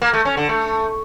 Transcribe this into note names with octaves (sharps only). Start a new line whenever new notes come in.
A#3
A3
C#4
D3
A3